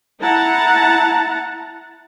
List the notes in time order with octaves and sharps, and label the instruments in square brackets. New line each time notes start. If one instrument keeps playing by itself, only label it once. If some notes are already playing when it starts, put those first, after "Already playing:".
[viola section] E4 F#5 A5 A#5